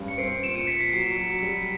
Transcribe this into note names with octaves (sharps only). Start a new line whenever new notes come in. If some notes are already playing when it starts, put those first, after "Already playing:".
Already playing: G2 C#4
C#7
C4 C7 D7
A#2 D7 E7
C#7 D#7
A#2 B6 C#7
C7
F#3 C7
F#3
G3